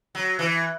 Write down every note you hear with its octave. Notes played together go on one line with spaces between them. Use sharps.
F#3
E3